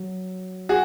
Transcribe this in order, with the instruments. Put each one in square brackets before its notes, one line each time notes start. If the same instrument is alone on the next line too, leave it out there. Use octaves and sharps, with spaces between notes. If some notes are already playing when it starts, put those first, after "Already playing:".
Already playing: [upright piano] F#3
[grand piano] F#4 G#4